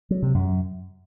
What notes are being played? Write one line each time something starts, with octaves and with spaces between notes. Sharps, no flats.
F#3
C3
F#2